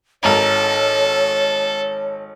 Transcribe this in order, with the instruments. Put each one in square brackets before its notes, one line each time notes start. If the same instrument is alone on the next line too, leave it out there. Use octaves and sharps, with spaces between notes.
[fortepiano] G#1 A#5 [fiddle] A4 [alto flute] C#5